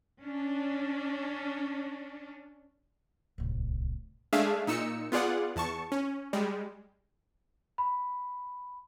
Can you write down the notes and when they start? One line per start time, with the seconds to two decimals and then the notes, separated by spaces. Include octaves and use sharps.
0.21 C#4 D4
3.38 D1 C2
4.33 G#3 A3 D4 G#4 E5 F5
4.67 A#2 D#4 E6 C#7
5.12 B3 F4 G#4 D5 F#5
5.56 E2 A5 C#6
5.92 C#4
6.33 G3 G#3
7.78 B5